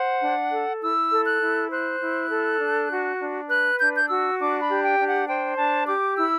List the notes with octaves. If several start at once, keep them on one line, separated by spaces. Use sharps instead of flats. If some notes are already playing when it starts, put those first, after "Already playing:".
Already playing: C5 F#5
D4
A4
E4 E6
A4
F#6
E4
C5 F#6
E4
A4
D4
F#4
D4
B4 F#6
D4 G6
G6
F#4 E6
D4 D6
B5
G4
G5
D4
F#5
C5 G5
D4 A5
G4 D6
E4 E6